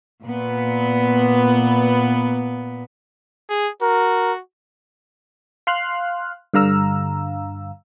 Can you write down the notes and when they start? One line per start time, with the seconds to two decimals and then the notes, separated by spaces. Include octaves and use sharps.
0.24 A#2 B3
3.50 G#4
3.82 F#4 A#4
5.67 F5 C6 F6 F#6
6.54 G2 D3 F5 A#5 E6